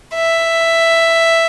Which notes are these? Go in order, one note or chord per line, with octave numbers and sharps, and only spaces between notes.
E5